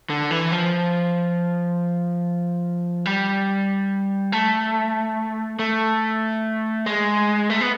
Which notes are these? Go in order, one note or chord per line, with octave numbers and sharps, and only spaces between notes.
D3
E3
F3
G3
A3
A3
G#3
A3
B3